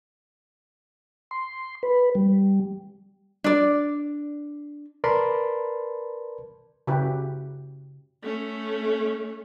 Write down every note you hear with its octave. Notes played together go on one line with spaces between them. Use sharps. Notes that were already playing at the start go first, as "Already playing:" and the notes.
C6
B4
G3
D4 D5
A#4 B4 D5 A5 B5 C6
C#3 E4 F#4 G4 B4
A3 C#4